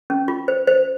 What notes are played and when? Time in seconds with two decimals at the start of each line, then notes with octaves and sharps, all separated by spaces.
0.10 C#4
0.28 F4
0.48 C5
0.67 C5